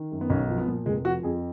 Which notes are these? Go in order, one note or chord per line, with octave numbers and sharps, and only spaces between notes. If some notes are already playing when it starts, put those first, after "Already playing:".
Already playing: D#3
F#2
B3
B1 C#4
F3
B3
A#2
F1 G#3
F3 F#4
F2 G#4